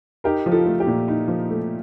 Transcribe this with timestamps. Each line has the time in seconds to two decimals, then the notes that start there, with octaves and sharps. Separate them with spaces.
0.24 D#4 G4 A#4
0.46 F3
0.52 F4 A4
0.65 A3
0.80 G4
0.87 A#2
1.08 D#4
1.28 F3
1.49 A3